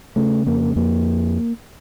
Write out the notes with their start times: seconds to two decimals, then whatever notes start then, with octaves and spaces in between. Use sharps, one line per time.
0.16 C#3 A3
0.47 F2 A#3
0.76 F2 A#3